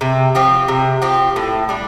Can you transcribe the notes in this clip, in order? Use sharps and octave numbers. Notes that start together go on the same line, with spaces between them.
C3
F3 C4 G4
C3
F3 C4 G4
A2
G3 D4